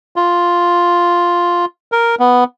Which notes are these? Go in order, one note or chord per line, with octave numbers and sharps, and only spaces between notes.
F4
A#4
B3